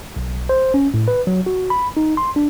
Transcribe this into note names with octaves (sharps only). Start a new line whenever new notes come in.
B1
C5
C#4
A2
B4
F#3
F#4
B5
D#4
C6
D4